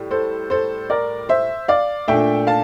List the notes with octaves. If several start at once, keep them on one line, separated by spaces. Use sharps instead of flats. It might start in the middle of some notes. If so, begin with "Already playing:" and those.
Already playing: A2 G3
A4 C5
A4 C5
A#4 D5
C5 E5
D5 F5
A#2 A3 D4 E5 G5
F5 A5